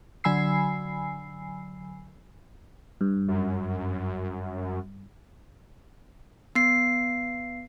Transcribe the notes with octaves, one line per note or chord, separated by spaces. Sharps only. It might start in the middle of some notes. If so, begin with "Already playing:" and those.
D3 F#3 G#5 B5 E6 C7
G2
F#2
B3 C7